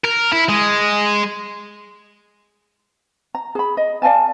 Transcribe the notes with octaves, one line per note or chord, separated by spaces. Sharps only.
A#4
E4
G#3
A#5
G#4 B5
D#5
D5 F5 G#5 A5